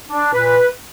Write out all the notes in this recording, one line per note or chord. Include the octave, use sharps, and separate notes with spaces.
D4
A#2 B4